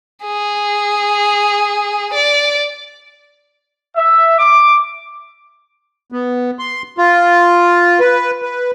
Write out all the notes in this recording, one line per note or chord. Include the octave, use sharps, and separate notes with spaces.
G#4
D5
E5
D6
B3
C6
F4
B4
B4